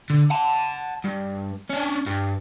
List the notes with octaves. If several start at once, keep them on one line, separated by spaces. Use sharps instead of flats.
D3
F#5 A5
G2
C#4 D4
G2